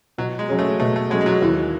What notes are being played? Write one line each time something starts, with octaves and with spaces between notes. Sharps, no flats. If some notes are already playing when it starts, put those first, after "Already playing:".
B2 F#3
G#3
F#3 C#4 G#4
A3
B2 A3
A3
F#3 G#3 C#4 G#4
G#3
F#3
D#2 E3